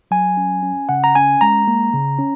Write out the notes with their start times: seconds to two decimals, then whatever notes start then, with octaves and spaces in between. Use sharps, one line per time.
0.11 F#3 G#5
0.37 C#4
0.63 C#4
0.89 C#3 F#5
1.04 A#5
1.15 C#4 G#5
1.41 G#3 A#5
1.68 A#3
1.93 C#3
2.19 C#4